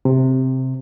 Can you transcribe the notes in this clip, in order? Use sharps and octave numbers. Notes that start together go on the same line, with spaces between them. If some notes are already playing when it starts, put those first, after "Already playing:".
C3